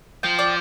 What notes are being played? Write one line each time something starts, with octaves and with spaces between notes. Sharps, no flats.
F3 G5
D5